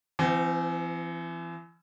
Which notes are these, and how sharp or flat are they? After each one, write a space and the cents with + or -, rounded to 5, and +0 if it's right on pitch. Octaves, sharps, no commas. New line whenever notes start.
E3 +40 C4 -20